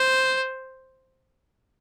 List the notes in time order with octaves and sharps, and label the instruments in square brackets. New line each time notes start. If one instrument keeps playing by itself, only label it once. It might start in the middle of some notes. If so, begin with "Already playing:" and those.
Already playing: [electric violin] C5